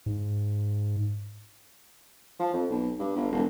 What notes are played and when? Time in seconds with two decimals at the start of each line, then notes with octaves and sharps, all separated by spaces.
0.06 G#2
2.40 F3
2.54 F2
2.70 B1
2.99 G2
3.16 G1
3.32 E1